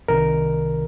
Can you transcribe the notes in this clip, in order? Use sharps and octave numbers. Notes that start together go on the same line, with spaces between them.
C2 C3 D#3 A#4